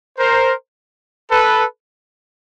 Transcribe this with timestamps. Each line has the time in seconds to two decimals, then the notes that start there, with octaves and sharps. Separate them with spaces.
0.19 A#4 C5
1.31 A4 B4